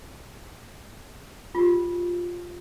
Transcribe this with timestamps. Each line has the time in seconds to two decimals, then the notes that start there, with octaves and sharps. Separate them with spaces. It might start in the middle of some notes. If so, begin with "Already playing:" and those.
1.55 F4 G4